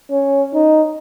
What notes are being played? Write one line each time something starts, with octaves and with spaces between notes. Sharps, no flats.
C#4
D#4